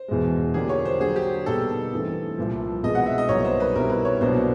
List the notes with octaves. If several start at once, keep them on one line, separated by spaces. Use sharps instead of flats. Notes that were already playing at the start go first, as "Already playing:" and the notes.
Already playing: C5
E2 B2 G#3
D3 F3 A#3 D4 G4 G#4
C#5
C5
D3 F#3 A#3 G#4
G4
B2 G3 A#3 D#4 G#4 A4
G2 E3 A3 C4
C2 A#2 F3
B2 G#3 C4 E4 D#5
F#5
E5
D#5
C2 B2 F#3 A#3 D#4 C#5
C5
B4
B2 G3 C4 E4 A#4
B4
C#5
C2 B2 F#3 A#3 D4 C5